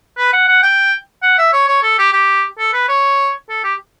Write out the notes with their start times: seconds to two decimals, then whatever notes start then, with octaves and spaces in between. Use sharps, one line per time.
0.17 B4
0.33 F#5
0.48 F#5
0.63 G5
1.23 F#5
1.38 E5
1.53 C#5
1.68 C#5
1.83 A4
1.99 G4
2.13 G4
2.59 A4
2.73 B4
2.89 C#5
3.49 A4
3.64 G4